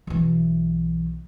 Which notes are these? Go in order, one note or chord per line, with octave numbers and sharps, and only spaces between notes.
B1 E3